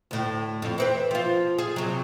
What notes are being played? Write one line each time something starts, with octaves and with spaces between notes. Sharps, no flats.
D2 A2
F2
E3 C4 B4
F3 F4
G#4
C3 F#3